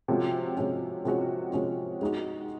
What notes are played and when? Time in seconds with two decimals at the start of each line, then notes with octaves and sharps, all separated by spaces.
0.08 C3 F3 G#3 C#4 F#4
0.57 C3 F3 G#3 C#4 F#4
1.05 C3 F3 G#3 C#4 F#4
1.53 C3 F3 G#3 C#4 F#4
2.01 G#3 D#4 F#4